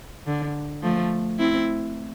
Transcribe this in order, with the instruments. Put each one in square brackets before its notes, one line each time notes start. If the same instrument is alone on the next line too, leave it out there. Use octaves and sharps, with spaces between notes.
[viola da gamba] D3
F3 A3
C4 E4